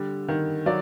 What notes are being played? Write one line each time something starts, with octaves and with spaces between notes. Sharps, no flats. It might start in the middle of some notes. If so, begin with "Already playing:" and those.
Already playing: D3 G3
D#3
F#3 D5